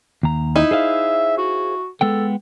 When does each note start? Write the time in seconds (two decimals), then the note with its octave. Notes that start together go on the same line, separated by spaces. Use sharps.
0.23 D#2 A#5
0.56 D#4 E4
0.71 G#4 C5 E5 F5
1.38 F#4
2.01 G#3 B3 A4 G5